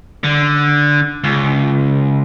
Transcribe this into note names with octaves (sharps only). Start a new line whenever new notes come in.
D3
C#2